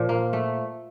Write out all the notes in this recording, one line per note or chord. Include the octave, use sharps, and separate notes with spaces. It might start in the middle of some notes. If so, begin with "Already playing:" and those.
Already playing: A#2 F3
A#3
A3